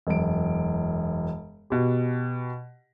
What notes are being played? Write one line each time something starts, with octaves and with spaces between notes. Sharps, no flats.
E1 F#2 D7
B2 G4